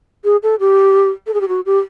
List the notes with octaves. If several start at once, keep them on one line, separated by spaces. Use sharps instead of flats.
G#4
A4
G4
A4
G#4
G4
F#4
G4